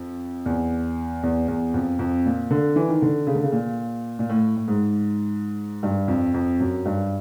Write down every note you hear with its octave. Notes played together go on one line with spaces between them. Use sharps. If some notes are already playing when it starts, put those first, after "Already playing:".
Already playing: F2
E2
E2
E2
F2
F2
A#2
D3
E3
D#3
D3
C#3
D3
C#3
A#2
A#2
A2
A2
G#2
G2
F2
F2
F#2
G2